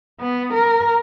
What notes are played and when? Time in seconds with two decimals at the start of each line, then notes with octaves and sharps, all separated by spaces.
0.20 B3
0.54 A#4